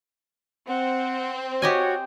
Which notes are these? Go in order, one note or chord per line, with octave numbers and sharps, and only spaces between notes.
C4 F#5
F#4 G4 C#5 D#5 G#5